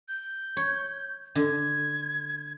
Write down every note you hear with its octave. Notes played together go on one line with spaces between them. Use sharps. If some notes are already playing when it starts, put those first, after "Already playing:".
G6
C#5
D3 G#6